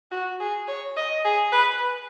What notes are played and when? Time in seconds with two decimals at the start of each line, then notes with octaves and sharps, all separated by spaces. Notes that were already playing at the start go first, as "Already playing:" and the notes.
0.11 F#4
0.40 G#4
0.68 C#5
0.97 D#5
1.24 G#4
1.52 B4